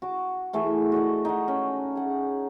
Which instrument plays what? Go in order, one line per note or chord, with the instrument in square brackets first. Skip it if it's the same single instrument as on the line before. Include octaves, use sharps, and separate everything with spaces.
[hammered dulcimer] F#4 D6
E3 A3 G#4 E5
F#4 D5 D#5
D#4 F#4 F#5
C#4
G#4 F#5